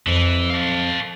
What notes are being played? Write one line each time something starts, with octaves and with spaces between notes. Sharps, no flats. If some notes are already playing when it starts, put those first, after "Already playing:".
F2 E3
A4 F5